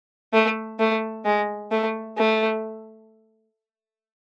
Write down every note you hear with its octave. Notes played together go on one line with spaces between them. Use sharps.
A3
A3
G#3
A3
A3